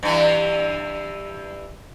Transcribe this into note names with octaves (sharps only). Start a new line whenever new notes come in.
G2 E3